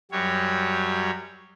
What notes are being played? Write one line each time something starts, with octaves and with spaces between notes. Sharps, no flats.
F#2 F#3 G3 C#5